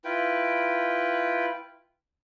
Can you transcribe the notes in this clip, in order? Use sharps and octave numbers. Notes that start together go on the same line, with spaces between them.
E4 F4 B4 G5